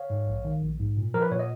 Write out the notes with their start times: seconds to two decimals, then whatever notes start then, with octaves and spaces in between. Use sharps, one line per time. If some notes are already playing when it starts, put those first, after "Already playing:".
Already playing: C#5 F5
0.10 G#2
0.27 A#1
0.45 D#3
0.61 A#1
0.79 G#2
0.97 A#2
1.14 F3 A#4
1.22 B4
1.31 A#2 C#5
1.39 D#5